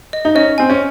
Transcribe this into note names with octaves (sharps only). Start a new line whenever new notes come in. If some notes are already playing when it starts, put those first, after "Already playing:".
D#5
D#4
C#4 D#5
C4 G#5
C#4